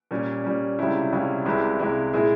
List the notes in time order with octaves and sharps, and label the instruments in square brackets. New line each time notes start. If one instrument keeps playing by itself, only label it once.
[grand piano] A#2 G3 C#4
A#2 G3 C#4
C#2 C3 G3 C#4 E4
C#2 C3 G3 C#4 E4
C2 C3 E3 G#3 E4
C2 C3 E3 G#3 E4
A#2 G#3 E4 G#4